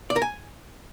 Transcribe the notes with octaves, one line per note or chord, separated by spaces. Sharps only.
D5
A#4
G#5